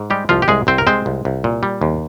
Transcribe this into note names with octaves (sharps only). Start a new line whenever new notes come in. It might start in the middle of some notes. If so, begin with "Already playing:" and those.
Already playing: G#2
G3 G#3 G4
C2 F3 F4
G4
C2 G#3 G#4
C2 C4 C5
A#4
G#3 C4 C5
C2
C2
A#2
G3
D#2